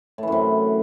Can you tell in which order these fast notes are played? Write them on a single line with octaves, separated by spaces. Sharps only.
A2 E3 F#2 C3